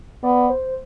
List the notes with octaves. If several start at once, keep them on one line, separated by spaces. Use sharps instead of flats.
B3 D5
C5